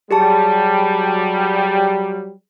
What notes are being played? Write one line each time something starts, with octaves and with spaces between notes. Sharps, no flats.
F#3 G3 G4 G#4 A5